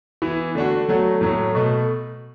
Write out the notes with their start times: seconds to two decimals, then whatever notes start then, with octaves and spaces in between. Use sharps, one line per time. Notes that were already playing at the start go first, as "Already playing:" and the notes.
0.22 E3 B3 E4
0.55 D3 A3 D4 F#4
0.89 F#3 A3 F#4
1.21 A2 F#3 A3
1.55 B2 A3